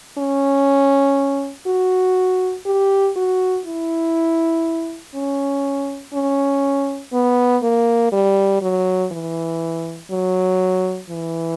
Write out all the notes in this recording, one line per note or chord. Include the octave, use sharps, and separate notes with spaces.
C#4
F#4
G4
F#4
E4
C#4
C#4
B3
A#3
G3
F#3
E3
F#3
E3